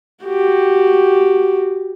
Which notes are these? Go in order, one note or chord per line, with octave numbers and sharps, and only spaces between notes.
F#4 G4